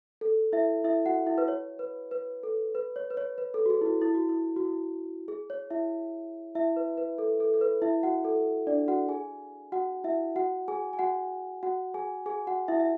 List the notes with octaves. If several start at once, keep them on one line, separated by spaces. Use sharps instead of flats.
A4
E4 E5
E4 E5
F#4 F#5
E4 E5
B4
C#5
B4
B4
A4
B4
C#5
B4
C#5
B4
A4
F#4
G#4
E4
F#4
E4
F#4
E4
F#4
E4
G#4
C#5
E4 E5
E4 E5
B4
B4
A4
A4
A4
B4
E4 E5
F#4 F#5
A4
D4 D5
F#4 F#5
G#4 G#5
F#4 F#5
E4 E5
F#4 F#5
G#4 G#5
G#5
F#4 F#5
F#4 F#5
G#4 G#5
G#4 G#5
F#4 F#5
E4 E5
E5